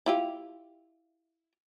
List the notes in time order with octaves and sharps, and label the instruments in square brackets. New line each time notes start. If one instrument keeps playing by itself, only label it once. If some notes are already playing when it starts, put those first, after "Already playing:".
[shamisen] E4 F4 G4